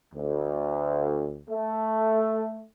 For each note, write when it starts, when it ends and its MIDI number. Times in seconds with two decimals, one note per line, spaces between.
0.14 1.37 38
1.49 2.64 57